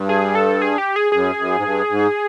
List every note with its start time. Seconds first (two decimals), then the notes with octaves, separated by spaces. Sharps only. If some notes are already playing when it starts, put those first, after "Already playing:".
Already playing: G2
0.09 G#4
0.35 A4
0.62 G#4
0.78 G4
0.96 G#4
1.12 F#2 G#4
1.38 F#2
1.57 G#2
1.64 G2
1.89 G#2